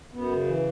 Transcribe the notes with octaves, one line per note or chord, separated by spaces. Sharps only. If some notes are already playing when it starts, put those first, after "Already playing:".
F#2 B3
C#3
E3